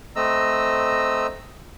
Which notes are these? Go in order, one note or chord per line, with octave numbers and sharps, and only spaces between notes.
A3 C4 D#5 A#5 E6